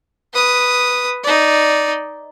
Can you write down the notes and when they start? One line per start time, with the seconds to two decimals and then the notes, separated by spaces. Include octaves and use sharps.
0.33 B4 D#6
1.24 D#4 D5